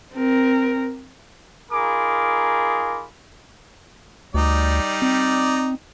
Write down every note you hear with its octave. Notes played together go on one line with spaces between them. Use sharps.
C4 A#4
D#4 F4 G#4 A#4 B5 D6
D2 G3 D#4 D5
C4